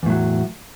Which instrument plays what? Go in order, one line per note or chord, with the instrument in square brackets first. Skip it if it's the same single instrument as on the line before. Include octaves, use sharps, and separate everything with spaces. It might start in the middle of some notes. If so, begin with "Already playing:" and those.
[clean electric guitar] E2
A2
F#3